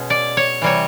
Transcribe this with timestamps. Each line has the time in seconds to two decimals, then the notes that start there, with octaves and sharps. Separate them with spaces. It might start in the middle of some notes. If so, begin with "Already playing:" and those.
Already playing: B2 G#3 C#4
0.10 D5
0.37 C#5
0.62 C3 E3 G3 C#5